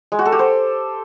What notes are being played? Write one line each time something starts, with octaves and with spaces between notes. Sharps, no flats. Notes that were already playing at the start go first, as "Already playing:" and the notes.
G#3
F#4
A4
G4
C5